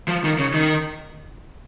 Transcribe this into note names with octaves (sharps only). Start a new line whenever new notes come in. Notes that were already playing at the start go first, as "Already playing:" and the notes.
F3
D#3
C#3
D#3